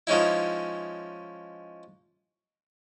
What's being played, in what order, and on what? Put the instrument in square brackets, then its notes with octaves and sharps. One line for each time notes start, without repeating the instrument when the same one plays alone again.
[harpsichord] F3 G#3 C#4 D#4 E4